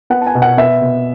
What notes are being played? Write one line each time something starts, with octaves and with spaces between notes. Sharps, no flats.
B3 F#5
A5
G#5
B2
F#5
B3 E5
B2